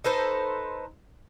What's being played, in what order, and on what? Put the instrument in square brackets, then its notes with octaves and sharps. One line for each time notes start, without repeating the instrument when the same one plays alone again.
[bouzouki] D#4 A4 B4 C5